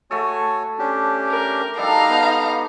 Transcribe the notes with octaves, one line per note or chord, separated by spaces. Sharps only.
A3 F#4 A4 C#5 G#5
C#4 D4 G4
A#4
G3 D4 D#4 A4 F5 A#5
B3